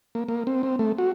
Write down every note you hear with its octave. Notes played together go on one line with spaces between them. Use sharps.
A#3
A#3
C4
C4
A3
F#4